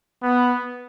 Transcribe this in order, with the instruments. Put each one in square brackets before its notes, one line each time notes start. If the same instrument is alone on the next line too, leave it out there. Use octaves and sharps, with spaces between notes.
[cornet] B3